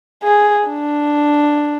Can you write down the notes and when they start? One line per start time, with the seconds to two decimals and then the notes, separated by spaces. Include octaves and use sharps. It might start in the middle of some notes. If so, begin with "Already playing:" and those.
0.23 G#4
0.68 D4